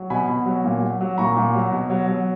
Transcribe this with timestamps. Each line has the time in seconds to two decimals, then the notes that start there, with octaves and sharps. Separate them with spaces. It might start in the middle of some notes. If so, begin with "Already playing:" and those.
Already playing: F#3
0.10 B2 G#5 B5
0.28 B2
0.46 F#3
0.65 A#2
0.82 F#3
1.01 F#3
1.18 A#2 A#5 C#6
1.37 A#2
1.55 F#3
1.72 B2
1.90 F#3
2.08 F#3